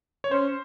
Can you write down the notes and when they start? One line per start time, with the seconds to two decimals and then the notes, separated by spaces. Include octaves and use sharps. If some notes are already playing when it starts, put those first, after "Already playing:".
0.24 C#5
0.31 C#4 C5